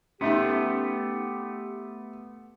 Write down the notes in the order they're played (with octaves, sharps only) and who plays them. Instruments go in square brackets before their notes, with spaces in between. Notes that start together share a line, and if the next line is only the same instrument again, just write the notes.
[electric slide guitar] A3 B3 [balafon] C#4 D#4 [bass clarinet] G4 [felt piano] E5 C6